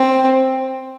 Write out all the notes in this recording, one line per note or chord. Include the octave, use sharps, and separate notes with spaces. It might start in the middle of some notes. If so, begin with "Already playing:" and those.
Already playing: C4